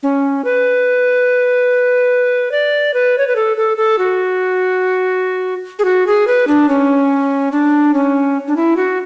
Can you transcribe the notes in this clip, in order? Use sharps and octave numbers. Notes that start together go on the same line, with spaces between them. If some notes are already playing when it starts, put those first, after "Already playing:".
C#4
B4
D5
B4
C#5
B4
A4
A4
A4
F#4
G#4
F#4
G#4
B4
D4
C#4
D4
C#4
D4
E4
F#4